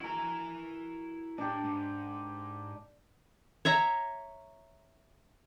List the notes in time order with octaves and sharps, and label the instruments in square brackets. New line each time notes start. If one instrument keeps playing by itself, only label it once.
[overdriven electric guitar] E4 G#5 [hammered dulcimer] F#4 A#4
[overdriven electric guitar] A2 [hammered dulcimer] D4 G4
[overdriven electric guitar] G#2
[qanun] C#5 E5 A#5